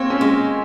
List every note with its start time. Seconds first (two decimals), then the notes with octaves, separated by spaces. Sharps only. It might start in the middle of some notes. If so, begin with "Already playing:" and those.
Already playing: A#3 C4 C#5
0.10 C#4
0.21 G#3